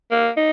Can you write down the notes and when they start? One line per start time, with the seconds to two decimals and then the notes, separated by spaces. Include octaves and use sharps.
0.11 A#3
0.37 D#4